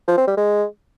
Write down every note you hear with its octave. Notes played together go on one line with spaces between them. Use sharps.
F3
C4
G3
G#3